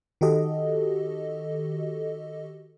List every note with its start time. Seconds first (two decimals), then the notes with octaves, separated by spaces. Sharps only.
0.21 D#3 F#4 G4 A4 D#5